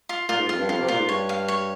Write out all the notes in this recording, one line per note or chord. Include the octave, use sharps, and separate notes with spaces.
F4
A#2 F4
G#2
F2 F4
G2
F2 F4
C3
A#2 F4
G#2
G2 C#5
F5
C#5